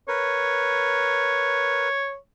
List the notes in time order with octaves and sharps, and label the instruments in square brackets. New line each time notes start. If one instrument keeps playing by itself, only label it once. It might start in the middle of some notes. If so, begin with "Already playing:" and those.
[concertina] A#4 B4 [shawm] C#5